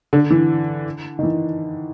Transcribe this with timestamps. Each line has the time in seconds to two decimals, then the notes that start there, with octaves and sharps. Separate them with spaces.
0.13 D3
0.30 E3
1.19 D#3
1.23 E3